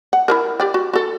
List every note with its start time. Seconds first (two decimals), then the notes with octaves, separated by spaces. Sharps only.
0.13 F#5
0.28 E4 G#4 A#4
0.60 G4 D5 G5
0.74 F#4
0.93 F#4 A4